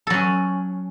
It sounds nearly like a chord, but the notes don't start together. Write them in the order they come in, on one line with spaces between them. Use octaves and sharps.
A4 F#3 C#4